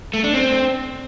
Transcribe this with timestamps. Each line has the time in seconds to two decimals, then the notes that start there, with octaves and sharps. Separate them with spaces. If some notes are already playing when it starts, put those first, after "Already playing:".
0.14 A3
0.24 D4
0.34 C4